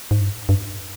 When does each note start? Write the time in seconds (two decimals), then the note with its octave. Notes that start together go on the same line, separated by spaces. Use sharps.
0.11 G#2
0.21 G2
0.49 G2